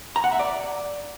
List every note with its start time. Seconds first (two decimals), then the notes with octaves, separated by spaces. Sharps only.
0.16 A#5
0.24 F#5
0.32 E5
0.39 D5